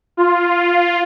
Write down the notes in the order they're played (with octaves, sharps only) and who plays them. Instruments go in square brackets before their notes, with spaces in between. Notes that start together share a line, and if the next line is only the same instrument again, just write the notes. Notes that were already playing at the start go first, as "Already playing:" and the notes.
[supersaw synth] F4